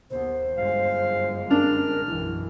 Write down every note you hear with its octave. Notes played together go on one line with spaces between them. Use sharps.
D#2 B3 C5
G1 F#2 G#3 F5
D4 A#4 F6
B1 F#2 E3 E4